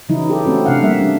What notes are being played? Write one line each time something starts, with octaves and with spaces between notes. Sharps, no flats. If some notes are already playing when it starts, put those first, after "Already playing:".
C#3 E3 F#3 D#4 E4
E4 G4 A4
A3 C4 C#4 F#4 A4
C3 D4 F5 F#5
G3 A#3 E5
G3 D4